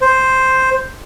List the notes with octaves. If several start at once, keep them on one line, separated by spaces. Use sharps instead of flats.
C5